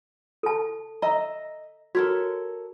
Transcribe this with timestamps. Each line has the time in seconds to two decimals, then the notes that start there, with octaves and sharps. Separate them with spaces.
0.43 A4 A5
1.02 D#5 E5 A#5
1.95 F#4 A4 A#4 C#5